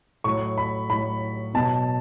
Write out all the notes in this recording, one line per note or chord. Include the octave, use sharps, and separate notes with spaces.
A2 F#3 C#6
B5
A2 F#3 B5
B2 F#3 A5